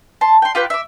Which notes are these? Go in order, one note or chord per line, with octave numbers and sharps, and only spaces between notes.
A5 C6
G5 C6
F4 G4 B4 G5
E5 D6